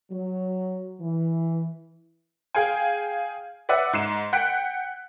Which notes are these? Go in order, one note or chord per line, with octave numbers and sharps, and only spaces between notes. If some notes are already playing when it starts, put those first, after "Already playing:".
F#3
E3
G#4 F5 G5 G#5
B4 D5 E5 F#5
G#2 C7 E7
F#5 G5 F#6 B6 D7